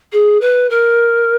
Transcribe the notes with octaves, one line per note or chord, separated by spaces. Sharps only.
G#4
B4
A#4